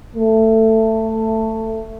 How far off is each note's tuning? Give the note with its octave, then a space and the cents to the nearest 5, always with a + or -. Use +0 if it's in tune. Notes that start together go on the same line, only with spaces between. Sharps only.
A3 +15